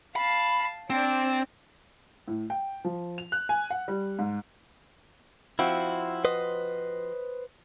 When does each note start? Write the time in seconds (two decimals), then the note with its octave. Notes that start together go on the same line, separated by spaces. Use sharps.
0.16 F5 A5 B5
0.90 C4 D4 D5
2.28 A2
2.50 G5
2.85 F3
3.18 F7
3.32 F#6
3.49 G#5
3.70 F#5
3.88 G3
4.19 G#2
5.59 F3 C4 E4 F#4
6.25 B4 C5 D#5